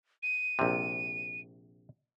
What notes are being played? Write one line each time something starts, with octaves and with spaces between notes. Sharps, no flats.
D#7
A#1 C3